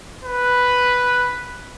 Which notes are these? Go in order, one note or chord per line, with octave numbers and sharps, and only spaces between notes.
B4